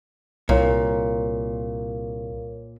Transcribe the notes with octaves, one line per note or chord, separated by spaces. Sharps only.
C2 A#2 A#4 C#5 F5